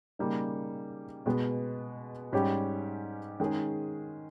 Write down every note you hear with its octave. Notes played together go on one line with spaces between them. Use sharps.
C#3 G3 A#3 D#4
B2 G#3 B3
G#2 G3 C#4 G4
D#3 G#3 C#4 G#4